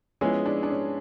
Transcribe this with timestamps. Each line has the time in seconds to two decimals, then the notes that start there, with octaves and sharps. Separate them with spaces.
0.21 F3 G#3 B3 C#4 E4 G#4
0.46 D4
0.63 D4
0.70 C#4